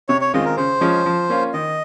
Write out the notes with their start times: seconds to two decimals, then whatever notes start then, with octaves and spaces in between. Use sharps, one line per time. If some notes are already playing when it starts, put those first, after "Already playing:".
0.09 C3 C#5
0.21 C#5
0.34 D#3 G#3 C4 F4 D#5
0.45 A#4
0.57 C#3 C5
0.81 F3 G#3 C#4
1.06 F3
1.29 A#3 C#4 F4
1.54 D#3 D#5